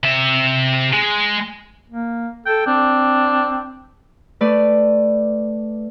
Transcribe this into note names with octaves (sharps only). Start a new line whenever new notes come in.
C3 E5
G#3
A#3
A4 G5
C4 D4
A3 B4 D5